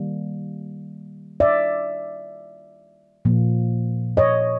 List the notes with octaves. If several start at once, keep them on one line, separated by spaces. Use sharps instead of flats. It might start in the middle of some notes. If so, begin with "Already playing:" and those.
Already playing: D#3 G3 A#3
D5 E5
A#2 F3 A#3
C#5 D#5